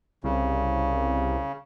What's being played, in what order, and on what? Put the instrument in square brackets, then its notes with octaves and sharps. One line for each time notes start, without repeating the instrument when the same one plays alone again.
[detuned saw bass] C2 [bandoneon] C#3